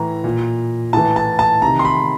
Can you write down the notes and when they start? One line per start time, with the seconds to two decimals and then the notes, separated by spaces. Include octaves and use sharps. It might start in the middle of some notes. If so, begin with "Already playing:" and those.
Already playing: A2 E3 A#5
0.24 A#2
0.93 A2 E3 A5
1.16 A5
1.39 A5
1.62 C3 D#3 A#5
1.79 C6
1.85 B5